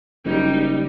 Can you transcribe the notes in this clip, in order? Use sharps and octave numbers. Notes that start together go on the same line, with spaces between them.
F#1 G3 D#4